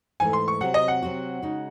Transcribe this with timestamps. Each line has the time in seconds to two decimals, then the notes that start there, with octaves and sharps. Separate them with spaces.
0.20 G#2 E3 A3 G#5
0.33 C6
0.48 C#6
0.61 C3 F#3 C4 F#5
0.74 D#5
0.88 F#5
1.02 C3 F#3 C4 F#4
1.42 C#3 G#3 D#4 F#4